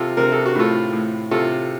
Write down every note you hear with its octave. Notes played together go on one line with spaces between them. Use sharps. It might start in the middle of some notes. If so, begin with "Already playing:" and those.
Already playing: C3 F4 A4
C3 A#4
A4
F#4
A2 F4 A4
A2
C3 F4 A4